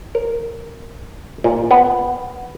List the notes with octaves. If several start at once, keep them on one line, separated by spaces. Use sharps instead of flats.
A#4
A#2
B3